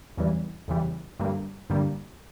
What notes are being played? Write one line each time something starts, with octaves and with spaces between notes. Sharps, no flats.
E2 C#3 E3 G3
E2 C#3 E3 G3
G2 D3 G3 A#3
G2 D3 G3 A#3